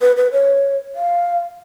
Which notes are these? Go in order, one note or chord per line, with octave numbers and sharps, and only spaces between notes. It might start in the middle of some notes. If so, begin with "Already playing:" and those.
B4
B4
C#5
F5